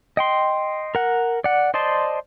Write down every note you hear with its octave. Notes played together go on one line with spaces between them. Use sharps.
D#5 G5 C6
A#4 F#5
D5 F#5
C5 D5 D#5 A5 C6